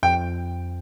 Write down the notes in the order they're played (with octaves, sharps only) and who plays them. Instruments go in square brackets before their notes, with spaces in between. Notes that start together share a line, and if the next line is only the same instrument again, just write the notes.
[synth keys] F2 [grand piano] G5